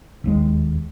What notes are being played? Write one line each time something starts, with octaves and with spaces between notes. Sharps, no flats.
E1 D#2 G#3